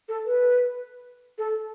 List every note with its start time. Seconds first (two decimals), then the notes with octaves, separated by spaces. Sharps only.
0.09 A4
0.26 B4
1.38 A4